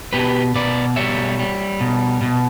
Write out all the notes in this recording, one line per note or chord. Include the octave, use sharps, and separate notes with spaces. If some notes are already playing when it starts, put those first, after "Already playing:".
B2 G4 B4
B2 B4 D5
G3 C#5 E5
G3
B2
B2